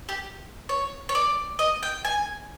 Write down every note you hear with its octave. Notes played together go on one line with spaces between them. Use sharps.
G4
C#5
C#5
D5
D#5
G5
G#5